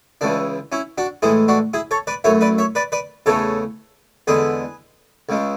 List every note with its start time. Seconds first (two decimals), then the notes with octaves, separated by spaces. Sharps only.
0.21 C#2 C#3 E3 D4
0.72 C#4 E4
0.98 D4 F#4
1.22 A2 E3 G#3 E4 G#4
1.48 D4 F#4
1.74 E4 G#4
1.91 A4 C#5
2.07 B4 D5
2.24 F#2 E3 A3 C#5 E5
2.41 B4 D5
2.58 C#5 E5
2.75 B4 D5
2.92 B4 D5
3.26 E2 C#3 E3 A3 A4 C#5
4.27 E2 D3 G#3 G#4 B4
5.29 C#2 C#3 G#3